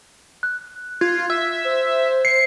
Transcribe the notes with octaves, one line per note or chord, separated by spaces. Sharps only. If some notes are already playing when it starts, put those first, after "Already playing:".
F#6
F4 G#6
E5
C5
C7 C#7